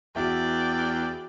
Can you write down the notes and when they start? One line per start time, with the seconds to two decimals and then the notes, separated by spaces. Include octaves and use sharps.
0.16 E2 F#4 D5 E5 G5